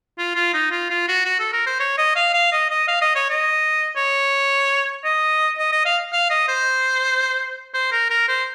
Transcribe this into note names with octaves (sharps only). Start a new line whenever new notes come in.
F4
F4
D#4
F4
F4
F#4
F#4
A4
A#4
C5
C#5
D#5
F5
F5
D#5
D#5
F5
D#5
C#5
D#5
C#5
D#5
D#5
D#5
F5
F5
D#5
C5
C5
A#4
A#4
C5